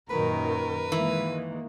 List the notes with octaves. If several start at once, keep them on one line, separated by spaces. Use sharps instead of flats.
F#2 A#2 D#3 A#4 B4
D#3 E3 G#3 A#3